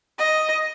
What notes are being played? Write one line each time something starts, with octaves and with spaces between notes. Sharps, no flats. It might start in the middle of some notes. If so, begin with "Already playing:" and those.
D#5